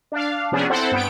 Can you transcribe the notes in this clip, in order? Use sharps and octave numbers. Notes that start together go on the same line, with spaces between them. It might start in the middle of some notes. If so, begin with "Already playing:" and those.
D4 F5
C3 F3 B3 C#4 D4 G#4
C4 E4 A4 C5 F#5
G2 B3 G5 D7